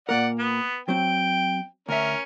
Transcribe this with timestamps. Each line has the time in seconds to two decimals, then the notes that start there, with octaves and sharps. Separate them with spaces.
0.09 A#2 A#3 A#4 D5 F#5
0.39 B3
0.89 F#3 C4 G5
1.89 D2 C#4 A#4 E5